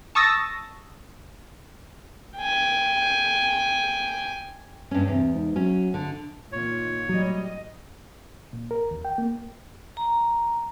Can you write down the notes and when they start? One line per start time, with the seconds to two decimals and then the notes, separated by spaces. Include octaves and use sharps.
0.15 A5 C#6 D#6 E6 A6 A#6
2.37 G5 G#5
4.91 G2 C#4
5.08 E2 C3
5.35 G#2
5.56 F#3 C#4
5.94 D3
6.52 A#2 D#3 F4 C#5
7.09 A2 F#3 G3 D#5
8.53 A#2
8.71 A#4
8.91 D#2
9.05 G5
9.18 A#3
9.97 A#5